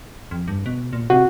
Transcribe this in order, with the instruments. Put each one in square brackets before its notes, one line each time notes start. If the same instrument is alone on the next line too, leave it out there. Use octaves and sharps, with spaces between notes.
[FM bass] F2
G2
B2
A#2
[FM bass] C3 [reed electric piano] F#4